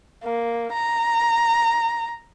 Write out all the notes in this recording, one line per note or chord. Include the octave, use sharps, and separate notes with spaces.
A#3
A#5